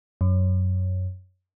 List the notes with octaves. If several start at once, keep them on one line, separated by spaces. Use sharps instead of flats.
F#2